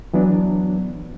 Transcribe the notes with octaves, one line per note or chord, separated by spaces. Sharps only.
E3 F#3 B3 D4